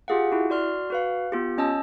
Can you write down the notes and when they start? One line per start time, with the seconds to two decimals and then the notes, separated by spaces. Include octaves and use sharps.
0.08 F4 G4 G#4 F5 F#5
0.32 E4 F#4
0.50 F#4 D5 C6 F6
0.90 F#4 B4 F5
1.32 B3 F4 G4
1.58 C#4 D#5 A5 E6